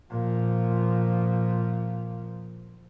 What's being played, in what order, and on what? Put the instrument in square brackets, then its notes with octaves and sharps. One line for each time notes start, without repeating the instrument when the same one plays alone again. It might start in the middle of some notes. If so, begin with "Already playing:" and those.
[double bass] A#2 F3